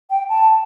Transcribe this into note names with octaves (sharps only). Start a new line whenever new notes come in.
G5
A5